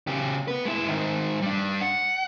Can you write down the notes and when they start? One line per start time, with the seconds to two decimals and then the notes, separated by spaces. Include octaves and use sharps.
0.07 C#3 G4
0.48 B3 B4
0.65 G#3 E4
0.87 G#2 D#3
1.42 G3 D4
1.81 F#5